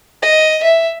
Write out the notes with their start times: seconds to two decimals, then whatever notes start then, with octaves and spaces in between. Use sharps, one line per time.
0.22 D#5
0.63 E5